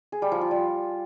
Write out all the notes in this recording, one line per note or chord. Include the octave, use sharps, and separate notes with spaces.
G#4
G3
F3
F4
G3